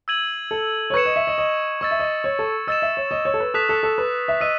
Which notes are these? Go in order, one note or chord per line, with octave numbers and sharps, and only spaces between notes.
E6 G#6 D#7 F#7
A4
C#5
B4 C#6 G#6 C#7 E7
D#5
E5
D#5
D#5
D#5 C#6 E6 A6
E5
D#5
C#5
A4
D#5 E6 A6 E7
E5
C#5
D#5
C#5
A4
B4
A4 D#6 F#6 B6 E7
A4
A4
B4
E5
D#5 E6 B6 D#7